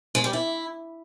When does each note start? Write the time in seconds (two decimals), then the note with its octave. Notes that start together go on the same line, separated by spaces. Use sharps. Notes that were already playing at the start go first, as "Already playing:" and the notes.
0.15 G#3
0.24 G3
0.33 E4